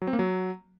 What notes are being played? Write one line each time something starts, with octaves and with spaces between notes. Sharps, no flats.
F#3
C4
A#3
F#3